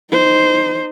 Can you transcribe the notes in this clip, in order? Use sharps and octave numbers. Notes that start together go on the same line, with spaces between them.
D#4 C5